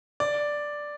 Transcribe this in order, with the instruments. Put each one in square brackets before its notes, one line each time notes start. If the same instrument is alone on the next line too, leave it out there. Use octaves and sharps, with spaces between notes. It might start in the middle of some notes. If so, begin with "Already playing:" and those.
[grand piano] D5